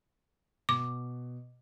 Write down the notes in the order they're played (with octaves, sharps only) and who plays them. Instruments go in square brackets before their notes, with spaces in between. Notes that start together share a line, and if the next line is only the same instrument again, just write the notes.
[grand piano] B2 [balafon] D6